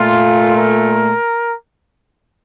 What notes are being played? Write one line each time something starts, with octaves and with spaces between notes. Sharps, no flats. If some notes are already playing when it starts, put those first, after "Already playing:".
Already playing: A#2 A3 F4
A#4